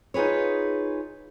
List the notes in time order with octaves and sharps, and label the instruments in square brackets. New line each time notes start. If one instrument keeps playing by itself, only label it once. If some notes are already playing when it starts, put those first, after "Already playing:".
[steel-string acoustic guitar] D#4 F4 G#4 B4 C#5